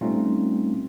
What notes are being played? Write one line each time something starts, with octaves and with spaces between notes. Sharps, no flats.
G3 A3 C4 C#4 D#4 F4